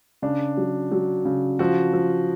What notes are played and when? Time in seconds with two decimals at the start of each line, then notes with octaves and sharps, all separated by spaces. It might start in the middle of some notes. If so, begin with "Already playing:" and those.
0.22 C#3 D4
0.57 F#3
0.92 F#3
1.25 C#3
1.59 F3 F#4
1.93 F3